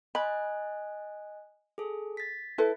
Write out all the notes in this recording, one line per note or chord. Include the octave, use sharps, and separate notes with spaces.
D#5 G#5 B5 F#6
G#4 A4
A6 B6
E4 A4 B4